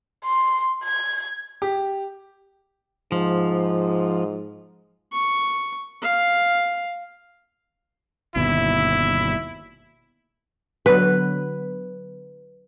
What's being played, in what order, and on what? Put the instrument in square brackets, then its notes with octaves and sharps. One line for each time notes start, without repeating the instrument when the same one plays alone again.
[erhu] C6
G#6
[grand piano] G4
[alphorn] G#2 [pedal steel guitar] F3
[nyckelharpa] C#6
F5
[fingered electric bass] G1 D#2 B2 [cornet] E4
[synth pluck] D3 F#3 B3 [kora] B4